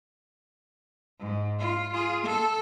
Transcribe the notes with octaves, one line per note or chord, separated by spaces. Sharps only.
G#2
F4
F4 G#4
A4